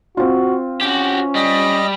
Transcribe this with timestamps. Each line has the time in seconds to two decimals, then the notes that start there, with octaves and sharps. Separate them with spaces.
0.17 C4 F4 F#4
0.81 C#4 F#4 G4
1.35 G3 D#5